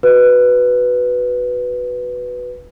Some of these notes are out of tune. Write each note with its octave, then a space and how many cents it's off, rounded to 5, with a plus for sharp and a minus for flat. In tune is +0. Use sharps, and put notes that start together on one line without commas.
F#4 +0 B4 +0